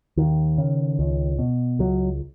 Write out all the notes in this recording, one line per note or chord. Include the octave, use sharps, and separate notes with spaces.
D#2 D#3
C#3
C#2
B2
C#2 F#3